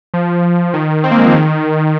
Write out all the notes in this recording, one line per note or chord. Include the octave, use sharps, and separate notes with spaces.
F3
D#3
C4
A#3
G#3
F3
D#3